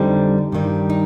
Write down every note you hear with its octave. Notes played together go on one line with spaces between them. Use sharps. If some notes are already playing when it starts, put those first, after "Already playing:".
Already playing: F2 D3 G3 C4 D#4
G2 D#3 G3
D#4